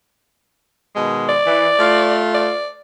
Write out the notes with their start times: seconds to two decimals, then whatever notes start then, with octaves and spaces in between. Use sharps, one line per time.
0.95 B2 D#3 G#3
1.29 D5
1.47 E3
1.79 A3 F4
2.34 D5